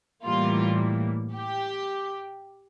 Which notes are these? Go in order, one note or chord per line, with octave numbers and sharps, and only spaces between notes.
A2 E3 G3 A#3 F4
G4